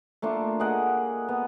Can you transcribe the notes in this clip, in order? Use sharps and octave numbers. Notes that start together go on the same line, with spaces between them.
A3 A#3 D4 F4
G#4 A#4 D#5 F#5
B3